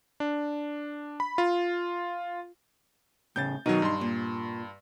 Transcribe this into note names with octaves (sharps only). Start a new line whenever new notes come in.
D4
B5
F4
A2 C#3 G6 A6
B2 D#3 F#3 D#4
G2 C6
A#2